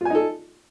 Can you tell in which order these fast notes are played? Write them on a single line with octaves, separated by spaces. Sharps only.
F4 G#5 D#4 A4